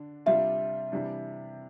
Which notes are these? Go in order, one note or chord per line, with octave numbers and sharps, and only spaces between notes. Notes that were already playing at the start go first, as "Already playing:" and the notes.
Already playing: D3 D4
C3 G3 D4 F4 E5
C3 E3 G3 D4